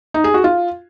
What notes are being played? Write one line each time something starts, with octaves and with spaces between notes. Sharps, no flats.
D#4
G#4
F#4
F4